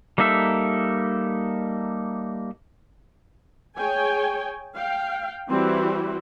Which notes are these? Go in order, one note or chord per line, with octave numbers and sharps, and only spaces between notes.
G3 A#3 D#4 A4 E5
G#4 C#5 G5 G#5
F5 G5
E3 G3 C4 E4 F#4